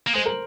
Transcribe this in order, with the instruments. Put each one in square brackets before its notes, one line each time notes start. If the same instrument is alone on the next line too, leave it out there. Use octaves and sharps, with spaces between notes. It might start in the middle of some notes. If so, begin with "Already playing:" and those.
[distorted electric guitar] A#3
[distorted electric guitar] G#3 [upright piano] C5
[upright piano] A#4